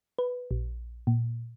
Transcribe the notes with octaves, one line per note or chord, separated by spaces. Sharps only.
B4
A#1
A#2